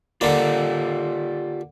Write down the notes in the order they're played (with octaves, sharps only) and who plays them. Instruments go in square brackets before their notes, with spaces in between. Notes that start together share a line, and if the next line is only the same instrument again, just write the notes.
[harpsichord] D3 A#3 [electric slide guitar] F4 G4 D5